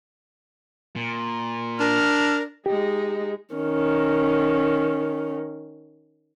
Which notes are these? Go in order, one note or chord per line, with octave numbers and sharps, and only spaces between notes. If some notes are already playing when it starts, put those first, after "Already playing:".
A#2
D4 A#4 F6
G#3 D#4 G4
D#3 C#4